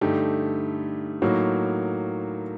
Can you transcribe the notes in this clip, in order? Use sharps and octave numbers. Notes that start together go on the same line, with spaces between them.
G2 D3 A3 D#4 G4
A2 F#3 A#3 D#4 F#4